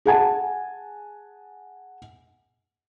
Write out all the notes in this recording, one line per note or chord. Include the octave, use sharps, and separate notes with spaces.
G#4 F#5 G#5 A5